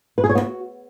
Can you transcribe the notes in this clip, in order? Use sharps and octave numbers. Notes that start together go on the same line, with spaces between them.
B4
G#4
C#5
B3
F#4